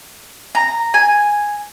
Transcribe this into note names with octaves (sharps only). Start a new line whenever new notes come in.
A#5
G#5